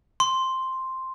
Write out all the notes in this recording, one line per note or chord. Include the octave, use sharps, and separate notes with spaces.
C6